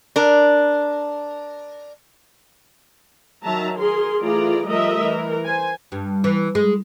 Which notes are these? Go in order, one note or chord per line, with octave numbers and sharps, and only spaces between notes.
D4 A#4
D#3 F#3 E5 A5 A#5
G#4 A#4 C6
E3 A3 F4 G#4 D5 A#5
F3 G3 A3 A#4 D#5 E5
E3 A#4
C5 G#5
G2
E3
G#3